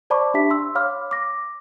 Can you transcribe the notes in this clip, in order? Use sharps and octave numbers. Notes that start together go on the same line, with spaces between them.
C5 D5 A5 B5 C#6 D6
D4 G4 E5 A5 B6
C6 E6
C#5 F5 B5 D6 F6
D6 A#6